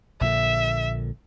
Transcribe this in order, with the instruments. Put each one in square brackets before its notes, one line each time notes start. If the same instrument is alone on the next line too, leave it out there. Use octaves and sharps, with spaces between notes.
[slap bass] A#1 A#2 D3 [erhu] E5